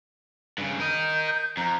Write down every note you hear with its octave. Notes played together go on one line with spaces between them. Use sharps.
G2 C#3
A#4 D#5 G6
F2 A#5